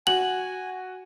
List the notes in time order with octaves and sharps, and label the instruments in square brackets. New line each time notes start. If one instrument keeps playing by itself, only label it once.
[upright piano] F#4 [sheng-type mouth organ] G#5 [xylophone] F#7